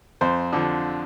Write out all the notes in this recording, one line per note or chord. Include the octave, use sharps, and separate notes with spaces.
F2 C5
D3 F3